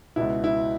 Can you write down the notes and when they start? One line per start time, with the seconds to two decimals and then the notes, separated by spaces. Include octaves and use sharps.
0.16 C#2 B2 E4
0.44 E4